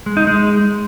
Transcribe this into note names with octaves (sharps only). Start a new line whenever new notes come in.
G#3
D#4
G#3